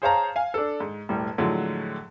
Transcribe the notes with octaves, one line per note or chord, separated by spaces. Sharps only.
G#4 C5 C#5 F5 A5 A#5
F5 G#5
D4 A4
G#2
E1 A2 G3
A2 D3 F3 F#3 G#3